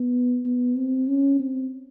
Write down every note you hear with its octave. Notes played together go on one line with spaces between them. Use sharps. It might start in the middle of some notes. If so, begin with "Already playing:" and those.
Already playing: B3
B3
C4
C#4
C4